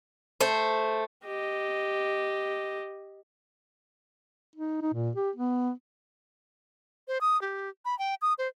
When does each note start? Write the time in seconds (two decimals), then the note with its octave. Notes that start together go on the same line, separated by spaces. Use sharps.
0.40 A3 C5
1.25 G4 D#5
4.56 D#4
4.82 D#4
4.94 A#2
5.16 G4
5.36 B3
7.08 C5
7.21 D#6
7.42 G4
7.85 B5
7.99 G5
8.22 D#6
8.38 C5